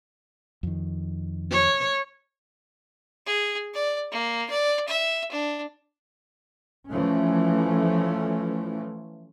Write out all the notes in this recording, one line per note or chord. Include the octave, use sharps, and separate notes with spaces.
F2 D#3
C#5
G#4
D5
A#3
D5
E5
D4
E3 F3 A3 C#4